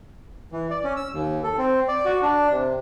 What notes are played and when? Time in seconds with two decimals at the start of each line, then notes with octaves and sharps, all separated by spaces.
0.52 E3
0.71 D5
0.84 C#4
0.96 E6
1.14 D#2
1.43 A4
1.58 C4
1.88 D5
2.05 F#4
2.23 D4
2.51 C3